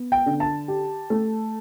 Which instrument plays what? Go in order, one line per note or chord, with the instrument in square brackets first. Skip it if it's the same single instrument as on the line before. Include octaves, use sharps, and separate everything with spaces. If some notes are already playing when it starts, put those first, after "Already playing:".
Already playing: [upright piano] B3
[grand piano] G5
[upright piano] D3
[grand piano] A5
[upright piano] G4
A3